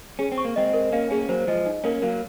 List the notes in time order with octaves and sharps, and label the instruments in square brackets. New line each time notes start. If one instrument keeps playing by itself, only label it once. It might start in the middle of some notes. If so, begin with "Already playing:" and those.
[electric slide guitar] C#4 [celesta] G#4
[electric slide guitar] C4
[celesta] C#6
[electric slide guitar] A#3
[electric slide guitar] G#3 C4 [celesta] D#5
[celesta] A#4
[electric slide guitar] A#3 C#4 [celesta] F5
[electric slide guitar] A#3 C#4 [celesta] G#4
[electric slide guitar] F#3 A#3 [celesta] C5
[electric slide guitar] F3 G#3 [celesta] D#5
[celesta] D#4
[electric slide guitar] A#3 C#4 [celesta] A#4
[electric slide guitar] F#3 A#3 [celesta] F5